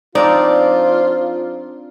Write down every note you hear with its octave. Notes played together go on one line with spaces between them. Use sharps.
F3 C4 D4 D#4 F4 D5